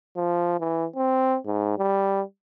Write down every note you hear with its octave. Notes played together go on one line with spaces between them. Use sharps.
F3
E3
C4
G#2
G3